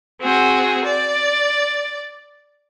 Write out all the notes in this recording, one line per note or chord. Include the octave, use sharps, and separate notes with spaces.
C4 F#4 G#4
D5